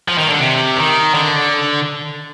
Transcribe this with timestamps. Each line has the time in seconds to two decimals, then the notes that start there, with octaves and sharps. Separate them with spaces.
0.08 F3
0.18 D#3
0.29 D3
0.39 C3
0.76 D#3
1.14 D3